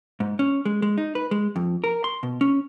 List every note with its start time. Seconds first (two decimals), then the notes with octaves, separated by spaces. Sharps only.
0.20 G#2
0.39 C#4
0.65 G#3
0.82 G#3
0.98 D#4
1.15 B4
1.31 G#3
1.56 F2
1.84 A#4
2.04 C6
2.23 B2
2.41 C#4